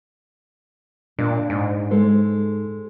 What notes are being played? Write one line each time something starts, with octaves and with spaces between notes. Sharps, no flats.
A#2 D4
G#2
G#3 A4 C5